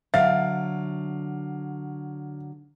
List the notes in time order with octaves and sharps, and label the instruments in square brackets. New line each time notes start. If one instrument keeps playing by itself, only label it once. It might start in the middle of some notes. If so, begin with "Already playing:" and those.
[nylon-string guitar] D3 F#3 [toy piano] E5 [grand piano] F5